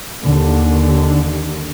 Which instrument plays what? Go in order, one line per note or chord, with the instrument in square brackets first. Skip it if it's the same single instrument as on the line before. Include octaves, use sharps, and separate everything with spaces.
[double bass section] D#2 D3